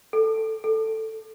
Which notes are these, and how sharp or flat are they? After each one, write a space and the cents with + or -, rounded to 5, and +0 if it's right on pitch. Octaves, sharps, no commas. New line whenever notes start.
A4 +5
A4 +5